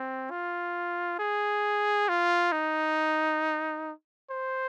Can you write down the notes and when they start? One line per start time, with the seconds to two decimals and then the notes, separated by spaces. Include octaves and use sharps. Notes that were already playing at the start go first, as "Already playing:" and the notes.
Already playing: C4
0.31 F4
1.19 G#4
2.09 F4
2.52 D#4
4.31 C5